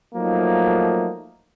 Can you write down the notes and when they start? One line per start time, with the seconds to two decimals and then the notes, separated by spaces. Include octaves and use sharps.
0.15 F3 F#3 A3 A#3 D#4